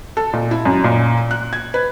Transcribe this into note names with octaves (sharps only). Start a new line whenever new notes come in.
A4
A#2
E4
F#2
A#2
F#6
G#6
B4